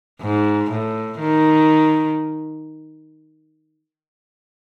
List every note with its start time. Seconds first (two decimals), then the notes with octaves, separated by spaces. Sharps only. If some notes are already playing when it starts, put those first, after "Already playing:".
0.22 G#2
0.71 A2
1.19 D#3